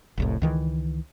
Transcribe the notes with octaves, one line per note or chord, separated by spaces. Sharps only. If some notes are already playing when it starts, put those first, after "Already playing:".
F1 C2 A2
C#2 D#3 E3